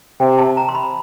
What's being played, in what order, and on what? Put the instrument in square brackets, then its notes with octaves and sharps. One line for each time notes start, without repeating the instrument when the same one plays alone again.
[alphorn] C3 [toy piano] G5
[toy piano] A5
A#5
C6
B5